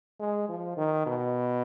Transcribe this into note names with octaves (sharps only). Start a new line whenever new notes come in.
G#3
F3
D#3
B2